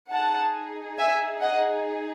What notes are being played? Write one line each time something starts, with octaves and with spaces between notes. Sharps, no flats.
D#4 G#4 F#5 A5
E5 G#5
D#5 F#5